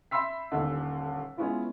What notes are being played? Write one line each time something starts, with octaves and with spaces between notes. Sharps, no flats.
E5 B5 C6 E6 B6
D#1 D#2 D3
G#3 B3 C#4 E4 F4